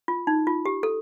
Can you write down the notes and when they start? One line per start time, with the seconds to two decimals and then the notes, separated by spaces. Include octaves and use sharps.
0.08 F4
0.27 D#4
0.47 F4
0.66 G4
0.83 A4